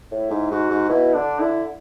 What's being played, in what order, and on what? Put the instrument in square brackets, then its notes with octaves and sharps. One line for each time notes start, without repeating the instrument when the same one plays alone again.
[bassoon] A2 [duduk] E4
[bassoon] G#2
[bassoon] G#2 [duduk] F#4
[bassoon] G#2
[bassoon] B2 [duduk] E4
[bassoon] D3 [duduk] D4
[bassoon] D3 [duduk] E4